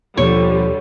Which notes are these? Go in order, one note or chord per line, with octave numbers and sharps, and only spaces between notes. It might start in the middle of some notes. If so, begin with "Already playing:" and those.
D#2 B2 D3 F3 G3 A#3 C#5